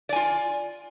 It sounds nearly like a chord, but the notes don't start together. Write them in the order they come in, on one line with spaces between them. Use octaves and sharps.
D5 G#5 F4